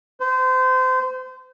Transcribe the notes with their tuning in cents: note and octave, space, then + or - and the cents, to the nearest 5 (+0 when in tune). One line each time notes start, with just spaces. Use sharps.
C5 -30